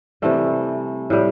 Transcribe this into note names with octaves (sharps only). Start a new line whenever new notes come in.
C3 E3 G3 A3
A2 G3